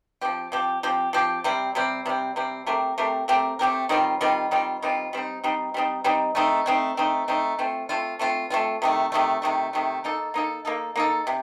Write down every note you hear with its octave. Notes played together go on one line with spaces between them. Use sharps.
F3 C4 G4
F3 C4 G4
F3 C4 G4
F3 C4 G4
C3 G3 C4
C3 G3 C4
C3 G3 C4
C3 G3 C4
A3 C4 G4 A#4
A3 C4 G4 A#4
A3 C4 G4 A#4
A3 C4 G4 A#4
D#3 G3 C4 F4
D#3 G3 C4 F4
D#3 G3 C4 F4
D#3 G3 C4 F4
G3 C4 D#4
G3 C4 D#4
G3 C4 D#4
G3 C4 D#4
A3 C4 D#4
A3 C4 D#4
A3 C4 D#4
A3 C4 D#4
A3 C4 F4
A3 C4 F4
A3 C4 F4
A3 C4 F4
C3 D#3 A3
C3 D#3 A3
C3 D#3 A3
C3 D#3 A3
A#3 D#4 A4
A#3 D#4 A4
A#3 D#4 A4
A#3 D#4 A4
C3